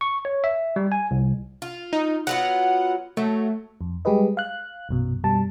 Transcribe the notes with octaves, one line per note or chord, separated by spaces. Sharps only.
C#6
C#5
E5
G3
G#5
C2
F4
D#4
F#3 B3 F4 F#5
F#3 A3
F2
G3 G#3 G4 G#4 B4 D#5
F5 F#6
A#1 F#2 B2
F#2 B2 G3 A5